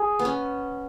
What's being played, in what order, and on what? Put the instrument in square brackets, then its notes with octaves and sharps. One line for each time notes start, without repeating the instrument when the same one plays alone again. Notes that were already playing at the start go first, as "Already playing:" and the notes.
Already playing: [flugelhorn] G#4
[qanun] B3
C#4